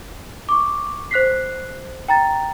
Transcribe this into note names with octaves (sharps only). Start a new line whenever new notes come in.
C#6 D6
C5 F#6 B6 C7
G5 A#5 A6